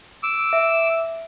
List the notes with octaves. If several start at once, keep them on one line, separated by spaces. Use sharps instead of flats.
D6 E6
E5